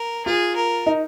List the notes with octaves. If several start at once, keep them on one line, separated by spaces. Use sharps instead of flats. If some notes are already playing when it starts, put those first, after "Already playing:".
Already playing: A#4
F4 G#4
A#4
D#4